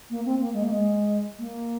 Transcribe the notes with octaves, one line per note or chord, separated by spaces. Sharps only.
A#3
C4
A#3
G#3
A#3
G#3
A#3